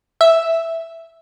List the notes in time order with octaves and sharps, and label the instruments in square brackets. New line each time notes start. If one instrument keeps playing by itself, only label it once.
[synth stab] E5